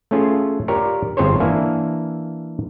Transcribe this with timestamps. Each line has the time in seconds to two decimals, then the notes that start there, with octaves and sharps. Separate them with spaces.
0.11 A3 C#4 F4 G#4
0.68 F4 G4 A#4 C#5 D5
1.17 G1 C4 F4 G#4 C5 C#5
1.40 E3 A#3 D4 E5 F5 G#5